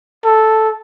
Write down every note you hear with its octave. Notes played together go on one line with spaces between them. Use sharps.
A4